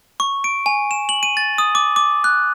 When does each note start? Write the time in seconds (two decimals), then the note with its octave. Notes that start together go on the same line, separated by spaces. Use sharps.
0.20 C#6
0.44 D7
0.66 G#5
0.91 E7
1.09 F#7
1.23 D#7
1.37 A6
1.58 D#6
1.75 D6
1.96 D6
2.24 F#6